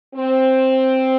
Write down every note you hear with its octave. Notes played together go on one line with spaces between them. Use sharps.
C4